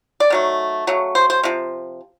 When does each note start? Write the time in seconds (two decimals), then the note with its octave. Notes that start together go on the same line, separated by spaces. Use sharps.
0.20 D5
0.30 D#3 F#3 A3
0.87 C#3 F#3 A3
1.15 C5
1.30 C5
1.43 C3 F3